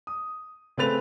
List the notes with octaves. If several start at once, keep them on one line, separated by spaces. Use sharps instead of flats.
D#6
C#3 A3 C4 B4 A6 F7